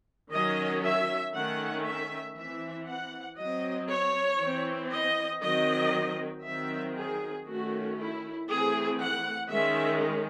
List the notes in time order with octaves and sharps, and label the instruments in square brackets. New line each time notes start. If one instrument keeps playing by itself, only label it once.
[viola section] D#3 F#3 C#4 D#5
E5
D#3 A3 C#4 F#5
E5
E3 C4 E5
F#5
F#3 C4 D#5
C#5
E3 C4
D#5
D#3 F#3 C4 D#5
D#3 F#3 C4 E5
G#4
D#3 A3 C#4 F#4
E4
E3 A3 C4 G#4
F#5
D#3 G#3 C#4 E5